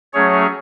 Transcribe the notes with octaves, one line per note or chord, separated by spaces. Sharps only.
F#3 A3 C#4 G#4 C#5